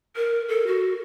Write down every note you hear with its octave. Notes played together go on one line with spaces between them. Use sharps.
A#4
A4
F#4